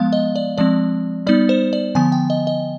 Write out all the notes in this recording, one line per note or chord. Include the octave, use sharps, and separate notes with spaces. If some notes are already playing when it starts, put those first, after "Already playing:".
Already playing: F3 G#3 B3 F5
D#5
D5
F3 G#3 C4 D5
G3 B3 D#4 D5
C5
D5
D3 F3 B3 G#5
G5
D#5
D#5